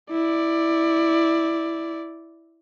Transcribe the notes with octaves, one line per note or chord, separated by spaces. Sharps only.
E4 D5